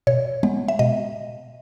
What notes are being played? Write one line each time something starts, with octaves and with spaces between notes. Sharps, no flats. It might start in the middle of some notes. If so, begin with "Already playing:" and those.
B2 C#5
G#3 B3
E5
B2 D#5